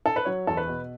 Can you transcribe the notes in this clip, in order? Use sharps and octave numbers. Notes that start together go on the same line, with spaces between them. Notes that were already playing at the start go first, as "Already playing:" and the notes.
A4
B4
F#3 C#5
E2 A4
B4
B2